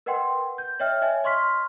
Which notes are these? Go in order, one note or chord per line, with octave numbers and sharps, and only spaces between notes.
A#4 B4 D#5 F#5 G5 C6
G6
C#5 D#5 E5 G5 F6
C#5 D#5 E5 G#5
D#5 C6 C#6 F6 B6